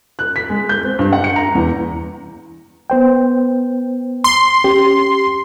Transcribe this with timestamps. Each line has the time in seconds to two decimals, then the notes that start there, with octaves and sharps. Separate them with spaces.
0.19 F#6
0.36 B6
0.49 G#3
0.69 G6
0.84 C4
0.99 G2
1.13 F#5
1.24 C#7
1.36 A#5
1.55 E2
2.90 B3 C5 G5
4.24 C6
4.64 C#4 G4